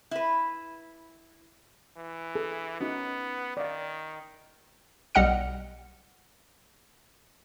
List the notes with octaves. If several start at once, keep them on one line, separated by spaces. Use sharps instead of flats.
E4 B4
E3
G#4 A4
B3 C#4 D#4 F#4
D#3 D5 F5
B1 G3 D#5 F#5 F6 C#7